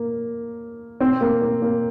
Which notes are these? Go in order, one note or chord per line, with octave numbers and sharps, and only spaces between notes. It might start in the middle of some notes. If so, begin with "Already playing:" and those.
Already playing: A#3
C4
A#3
A#3
A#3